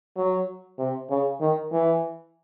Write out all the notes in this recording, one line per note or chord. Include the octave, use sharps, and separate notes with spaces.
F#3
C3
C#3
D#3
E3